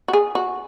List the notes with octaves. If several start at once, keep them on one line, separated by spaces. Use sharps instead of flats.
F#4
G#4
F#4